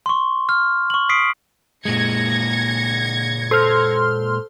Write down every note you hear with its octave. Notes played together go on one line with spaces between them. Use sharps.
C6 C#6
F6
C#6 F#7
D#6 B6 C7 D7
A#2 G#3 G#6 A#6 C#7
A4 C5 C6 F6